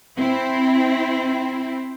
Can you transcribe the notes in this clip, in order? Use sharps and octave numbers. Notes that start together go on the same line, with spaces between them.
C4 E4